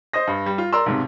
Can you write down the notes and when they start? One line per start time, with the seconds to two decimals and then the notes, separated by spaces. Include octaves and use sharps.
0.13 C5 D#5 D#6 A#6
0.27 G2
0.46 G3
0.58 F4
0.73 A#4 D5 A#5 C6 E6
0.86 B1 G#2 C3